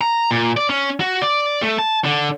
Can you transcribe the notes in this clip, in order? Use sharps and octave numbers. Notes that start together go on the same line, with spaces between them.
A#5
A#2
D5
C#4
F#4
D5
A3
A5
D3